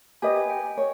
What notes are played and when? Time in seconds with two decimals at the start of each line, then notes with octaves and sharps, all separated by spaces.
0.22 G4 B4 D#5 G#5
0.36 G#5
0.50 G5
0.63 G#5
0.77 C#5